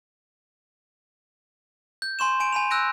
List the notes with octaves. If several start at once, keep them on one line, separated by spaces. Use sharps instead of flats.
G6
G#5 C6 C#6 E7
G#5 D7
G#5 B5 F7
E6 F#6 G6 A#6 D7